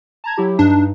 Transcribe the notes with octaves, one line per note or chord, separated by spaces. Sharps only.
A5 A#5 G#6
F#3 E4 G4
G2 D4 D#4